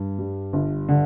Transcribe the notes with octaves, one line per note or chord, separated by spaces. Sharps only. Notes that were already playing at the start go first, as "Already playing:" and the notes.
Already playing: G2
G3
G1
D3